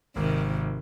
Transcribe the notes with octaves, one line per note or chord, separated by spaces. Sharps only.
G#1 C3 D#3